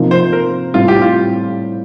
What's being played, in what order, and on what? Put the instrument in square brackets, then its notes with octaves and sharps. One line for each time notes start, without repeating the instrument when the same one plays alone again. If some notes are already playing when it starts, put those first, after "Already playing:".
Already playing: [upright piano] C3 F3 A#3 D#4
[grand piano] C5
A#4
[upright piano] A2 G3 C4 [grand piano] F4
[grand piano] G4
F4